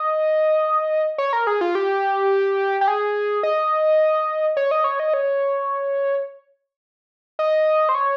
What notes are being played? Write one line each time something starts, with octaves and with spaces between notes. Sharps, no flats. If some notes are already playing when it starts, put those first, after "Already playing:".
Already playing: D#5
C#5
A#4
G#4
F4
G4
G4
G#4
D#5
C#5
D#5
C#5
D#5
C#5
D#5
C5
C#5